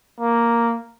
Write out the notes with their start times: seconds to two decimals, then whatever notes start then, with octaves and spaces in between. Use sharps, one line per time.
0.20 A#3